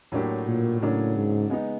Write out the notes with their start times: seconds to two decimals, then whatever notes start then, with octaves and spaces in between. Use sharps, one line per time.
0.12 A2 F#3 A#3 D4 G4
0.47 A#2
0.81 A2 C#3 F#3 A#3 D4
1.16 G#2
1.50 G#3 B3 D#4